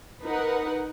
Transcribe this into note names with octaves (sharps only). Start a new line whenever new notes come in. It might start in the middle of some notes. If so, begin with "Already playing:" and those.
D#4 A#4 B4 F#5